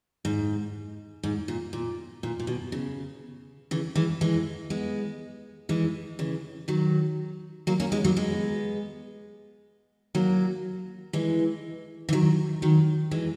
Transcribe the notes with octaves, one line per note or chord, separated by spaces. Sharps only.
G#2
G#2
A#2
A#2
A#2
A#2
B2
C#3
C#3 E3
E3 G#3
E3 G#3
G#3 B3
E3 G#3
C#3 E3
D#3 F#3
F#3 A#3
A#3 C#4
G#3 B3
F#3 A#3
G#3 B3
F#3 A#3
E3 G#3
E3
D#3 F#3
D#3 F#3
E3 G#3